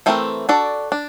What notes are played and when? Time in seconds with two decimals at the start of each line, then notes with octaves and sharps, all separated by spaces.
0.06 E3 A3 C4 F4 A#4
0.49 D4 F#4 A4 D5
0.92 D4